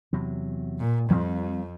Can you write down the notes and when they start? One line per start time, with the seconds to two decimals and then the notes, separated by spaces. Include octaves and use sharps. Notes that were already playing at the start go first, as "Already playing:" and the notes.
0.12 E2 C3 F#3
0.79 A#2
1.10 F2 F3 G3 C4